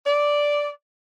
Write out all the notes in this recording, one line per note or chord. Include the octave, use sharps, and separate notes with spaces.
D5